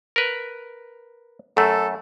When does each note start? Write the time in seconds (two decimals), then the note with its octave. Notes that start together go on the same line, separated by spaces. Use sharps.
0.16 A#4 B4
1.57 F#2 A3 A4